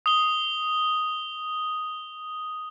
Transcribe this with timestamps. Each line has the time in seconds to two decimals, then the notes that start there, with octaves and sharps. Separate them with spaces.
0.06 D#6 G7